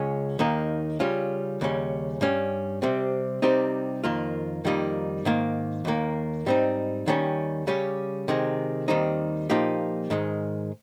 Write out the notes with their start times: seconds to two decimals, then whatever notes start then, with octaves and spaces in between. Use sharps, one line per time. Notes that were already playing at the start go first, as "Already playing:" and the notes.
Already playing: C#2 C#3 G#3 C#4
0.39 D#2 D#3 A#3 D#4
1.00 C#3 G3 C#4 F4
1.61 D#2 C#3 G3 C#4
2.21 G2 G3 C#4
2.82 C3 G3 C4
3.42 C3 G3 C4 D#4 G4
4.04 F2 D#3 A#3 F4
4.65 F2 D#3 G3 A#3 D#4
5.25 G#2 D#3 A#3
5.85 D#2 D#3 A#3
6.46 G#2 G3 C4 D#4
7.06 D#2 D#3 G3 C#4
7.67 C#3 G3 C#4 G4
8.28 C3 D#3 G#3
8.88 D#2 D#3 G3 C4 D#4
9.50 A#2 F3 A#3 D#4 G4
10.10 G#2 D#3 G#3